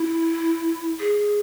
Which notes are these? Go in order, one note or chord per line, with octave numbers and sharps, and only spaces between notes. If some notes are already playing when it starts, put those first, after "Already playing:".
Already playing: E4
G#4